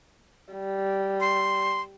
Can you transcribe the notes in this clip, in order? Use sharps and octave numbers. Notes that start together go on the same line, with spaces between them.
G3
C6